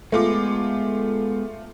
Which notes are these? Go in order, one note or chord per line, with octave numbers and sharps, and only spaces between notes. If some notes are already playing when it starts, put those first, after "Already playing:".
G#3 A3 B3 F4 D6